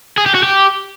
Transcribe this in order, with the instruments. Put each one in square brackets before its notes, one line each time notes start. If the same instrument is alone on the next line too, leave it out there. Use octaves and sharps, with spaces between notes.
[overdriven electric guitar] G#4
G4
F#4
G4